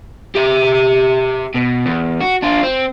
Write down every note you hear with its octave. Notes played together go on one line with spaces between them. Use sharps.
G4 E5
B2
E2
F#4
D4 F4
C4